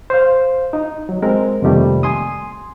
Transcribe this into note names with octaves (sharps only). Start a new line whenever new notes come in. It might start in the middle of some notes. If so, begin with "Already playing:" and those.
C5 F5
D#4
F#3
G#3 C4 A#4
F2 C3 D#3 G3 A3 A#3
G#5 C6 D#6